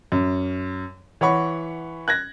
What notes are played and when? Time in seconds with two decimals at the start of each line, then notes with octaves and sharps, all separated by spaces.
0.12 F#2
1.21 E3 C#5 F#5 B5 C#6
2.08 F#6 G#6 A#6